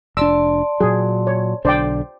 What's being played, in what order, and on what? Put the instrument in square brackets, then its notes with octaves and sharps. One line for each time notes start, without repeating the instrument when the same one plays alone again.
[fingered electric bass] F1 D4 [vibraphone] D5 A5 C6 [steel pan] E6
[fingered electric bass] A#2 F#3 [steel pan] G#4
[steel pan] C#5
[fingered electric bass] B1 D3 D4 [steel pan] C5 D5 G5